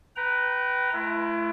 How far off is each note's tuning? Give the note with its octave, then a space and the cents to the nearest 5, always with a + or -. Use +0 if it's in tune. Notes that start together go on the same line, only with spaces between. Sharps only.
B4 +0 G5 -30 A#5 +0
A3 -35 E4 +35